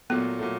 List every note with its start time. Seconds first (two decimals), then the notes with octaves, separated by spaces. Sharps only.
0.10 A#2 F#3 A3 B3
0.39 A#2 F#3 A3